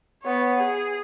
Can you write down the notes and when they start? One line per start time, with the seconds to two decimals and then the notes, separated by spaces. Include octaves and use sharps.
0.23 B3 C#5
0.56 G#4